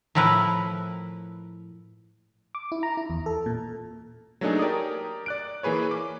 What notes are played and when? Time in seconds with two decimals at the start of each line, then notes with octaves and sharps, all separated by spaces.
0.15 A2 F3 E4 A#4 B4
2.55 D6
2.72 E4
2.83 A#5
2.97 E4
3.10 E2
3.26 A4
3.46 A#2
4.41 F#3 A3 A#3 D4 D#4 G#4
4.59 G4 A#4 D5 D#6
5.26 D5 F#6 D7
5.63 E3 A#3 G#4 B4 C#5
5.91 D6